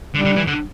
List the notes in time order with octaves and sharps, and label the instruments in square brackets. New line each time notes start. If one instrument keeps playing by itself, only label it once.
[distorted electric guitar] D3 [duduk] G3
[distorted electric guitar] D3
E3
D3